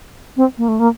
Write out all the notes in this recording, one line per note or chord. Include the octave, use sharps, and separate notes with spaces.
C4
A#3
A3
A#3